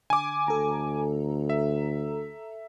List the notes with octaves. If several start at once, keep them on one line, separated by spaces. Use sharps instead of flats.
D3 G#5 D6
D2 A4 A#5
E5